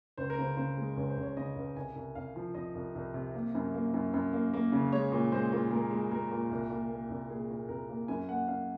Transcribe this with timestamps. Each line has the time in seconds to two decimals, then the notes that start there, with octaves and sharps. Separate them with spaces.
0.18 C#2 C5
0.30 A#4
0.38 C#3 C5
0.57 C#3 C5
0.77 G#3
0.97 C#2 C#5
1.10 C5
1.17 C#2
1.23 C#5
1.37 C#3 D#5
1.56 C#2
1.76 C2 G#5
1.96 C2
2.15 C2 F5
2.36 F3
2.55 C2 D#5
2.75 C2
2.95 C2
3.14 C3
3.35 A#3
3.55 F#2
3.74 A#3
3.94 F#2
4.14 F#2
4.33 A#3
4.54 A#3
4.72 C#3
4.92 G#3 C#5
5.12 A#2
5.32 G#3 C5
5.52 A#2
5.71 G#3 A#4
5.91 G#3
6.11 G#3 A#4
6.31 A#2
6.51 C2
6.71 A#2
6.90 A#3
7.10 C2
7.29 A#2 G#4
7.50 A#2
7.69 C2 A#4
7.89 A#3
8.08 F#2 G#5
8.28 A#3 F#5
8.48 F#2 F5